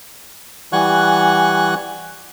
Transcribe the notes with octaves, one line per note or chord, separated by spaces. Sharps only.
E3 G3 F#5 G#5 C#6 F#6